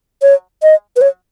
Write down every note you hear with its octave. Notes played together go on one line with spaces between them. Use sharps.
C#5
D#5
B4
C#5